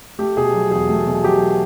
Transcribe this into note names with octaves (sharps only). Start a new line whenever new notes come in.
A3 G4
B2 G#4
F#3
E2 G#4
A3
B2
F#3 G4